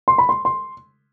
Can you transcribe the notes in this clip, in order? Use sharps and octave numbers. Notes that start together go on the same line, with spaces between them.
C6
B5
C6
C6